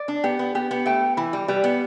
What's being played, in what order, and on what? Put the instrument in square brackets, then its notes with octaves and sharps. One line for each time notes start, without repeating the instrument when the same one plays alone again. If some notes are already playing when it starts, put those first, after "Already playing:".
Already playing: [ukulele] D5
[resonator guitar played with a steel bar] D4
[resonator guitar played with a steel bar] B3 [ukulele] G4
[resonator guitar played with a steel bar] B3
[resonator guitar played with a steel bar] B3 [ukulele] G4
[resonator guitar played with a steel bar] B3
[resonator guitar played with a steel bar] A3 [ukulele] G5
[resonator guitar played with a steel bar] E3 [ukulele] B5
[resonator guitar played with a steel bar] G3
[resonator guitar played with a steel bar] G3 [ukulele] B4
[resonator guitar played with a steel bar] B3